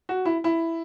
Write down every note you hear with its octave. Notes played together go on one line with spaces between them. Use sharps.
F#4
E4
E4